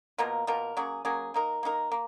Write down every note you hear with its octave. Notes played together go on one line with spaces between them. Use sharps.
B2 A#3 F4 A#4
B2 A#3 F4 A#4
F#3 A#3 C#4 G#4
F#3 A#3 C#4 G#4
A#3 D#4 A#4
A#3 D#4 A#4
A#3